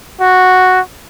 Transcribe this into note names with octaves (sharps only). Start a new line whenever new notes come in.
F#4